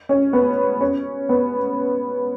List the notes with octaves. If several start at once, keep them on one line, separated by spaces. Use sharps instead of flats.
C#4
B3
C#4
B3